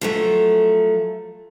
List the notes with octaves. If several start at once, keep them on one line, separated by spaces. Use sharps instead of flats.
F3 F#3 A3